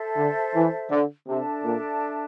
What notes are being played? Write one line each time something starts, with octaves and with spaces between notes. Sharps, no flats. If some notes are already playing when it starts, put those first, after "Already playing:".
Already playing: A4 C5 E5
D3
E3
D3
C3 D4 A4 E5 A5
A#2